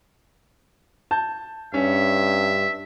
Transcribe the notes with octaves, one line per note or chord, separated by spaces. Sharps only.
A5 G6
G2 C#4 E5